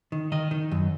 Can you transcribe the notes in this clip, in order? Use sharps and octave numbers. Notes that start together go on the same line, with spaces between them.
D#3
D#3 D#5
D#3
F#2